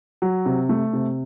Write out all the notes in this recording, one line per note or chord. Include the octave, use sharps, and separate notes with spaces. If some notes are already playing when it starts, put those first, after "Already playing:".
F#3
C3
A3
C3